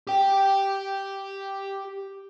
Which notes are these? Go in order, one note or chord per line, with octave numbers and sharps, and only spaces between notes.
G4 G5